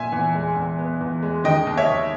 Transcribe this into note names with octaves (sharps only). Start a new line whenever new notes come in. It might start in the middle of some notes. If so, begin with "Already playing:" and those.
Already playing: A#2 E5 G#5
E2
G#3
E2
B3
E2
G#3
D#3 D#5 G5
D#2
C#5 E5
D#2